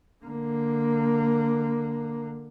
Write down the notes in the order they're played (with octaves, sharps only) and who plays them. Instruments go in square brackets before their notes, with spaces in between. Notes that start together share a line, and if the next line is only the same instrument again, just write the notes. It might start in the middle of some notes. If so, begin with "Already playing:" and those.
[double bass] D3 A#3